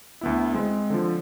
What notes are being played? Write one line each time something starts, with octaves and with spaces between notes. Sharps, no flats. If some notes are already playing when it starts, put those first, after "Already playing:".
D2 B3 E4
G#3 C4
D3 F3